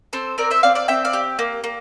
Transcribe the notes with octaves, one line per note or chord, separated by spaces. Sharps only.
C4 A4 C5
C4 A#4 D5
C5 E5
C4 D5 F5
D5 F5
C4 E5 G5
D5 F5
G4
A#3
A#3